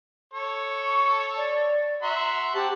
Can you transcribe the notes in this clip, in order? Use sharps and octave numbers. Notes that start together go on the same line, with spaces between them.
A4 C#5
C#6
D5
F#4 E5 A#5 C6
C4 G4 F#5 A5